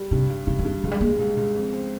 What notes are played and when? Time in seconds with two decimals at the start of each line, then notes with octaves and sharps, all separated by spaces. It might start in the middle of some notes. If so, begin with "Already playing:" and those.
Already playing: G3
0.11 G2 C3
0.29 G2
0.47 G2 C#3
0.59 D#3
0.65 G2
0.83 C#2 F3
0.91 G3
1.01 G#3 A#3
1.19 C#2
1.37 C#2
1.55 F2
1.73 C4